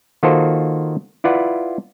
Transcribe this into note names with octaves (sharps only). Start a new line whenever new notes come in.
D#3 A#3 F4 F#4 A4 C5
E4 F4 B4 D5 F#5